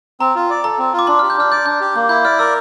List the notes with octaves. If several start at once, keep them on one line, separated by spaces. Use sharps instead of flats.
C4 A#5
F4
D5
A4 A#5
C4
F4
D6
D4 C6
G4 F6
G6
D4 F6
D5 G6
D4 G6
G4
A#3 G6
E4 G6
D5 F6
A#4 E6